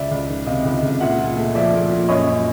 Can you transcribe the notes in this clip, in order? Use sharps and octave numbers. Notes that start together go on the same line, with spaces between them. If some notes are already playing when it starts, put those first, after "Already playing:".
Already playing: C#2 D5 E5
C#2
D#3
C3 D#5 F5
C#2
C#2
A#2 E5 F#5
A#2
A3
F3 D5 E5
A#2
A#2
F#2 C#5 D#5
F#2